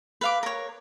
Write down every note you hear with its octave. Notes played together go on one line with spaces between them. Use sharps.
B4 F5 D6
A#4 C#5